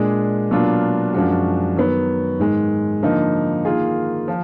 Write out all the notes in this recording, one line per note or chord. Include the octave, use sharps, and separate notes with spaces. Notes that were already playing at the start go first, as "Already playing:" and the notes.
Already playing: A#2 G#3 D4 G#4
B2 F#3 A#3 D4 F4
F#2 F3 G#3 D4 F#4
D#3 F#3 B3
G#2 D#3 G#3
D3 F3 A#3 D#4
D#3 A#3 F4 G#4
F3